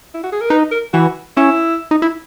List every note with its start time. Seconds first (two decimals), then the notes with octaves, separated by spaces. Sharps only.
0.15 E4
0.24 F#4
0.32 G#4
0.41 A#4
0.50 D#4 B4
0.72 A#4
0.93 E3 F#4
1.37 C#4 E4
1.91 D#4
2.02 E4